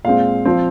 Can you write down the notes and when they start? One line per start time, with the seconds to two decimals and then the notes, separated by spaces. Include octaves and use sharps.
0.05 A#2 G#3 C4 F5
0.45 F3 C4